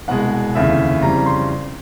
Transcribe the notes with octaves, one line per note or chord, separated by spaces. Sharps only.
C2 B2 G#3 F#5
F1 D#2 C#3 E3 E5
F2 C#3 E3 G3 A#5
C6